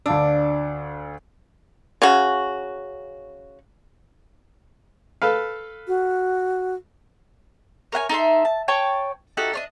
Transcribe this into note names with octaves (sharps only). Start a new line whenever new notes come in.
D2 D4 F5 E6
C#3 C#4 F#4
A4 B4 F5
F#4
A#4 C#5 F#5 G#5
D#4 A4 E5 C6
A5
C#5 G5 A5 C#6
D#4 F#4 G4 A4
D4 C#5 D#5